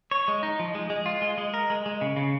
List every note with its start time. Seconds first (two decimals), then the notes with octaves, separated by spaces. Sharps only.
0.11 C#5
0.28 G#3
0.43 D#4
0.59 F3
0.75 G#3
0.90 G#3
1.06 F4
1.22 G#3
1.38 G#3
1.54 A#4
1.70 G#3
1.86 G#3
2.01 C#3
2.17 C#3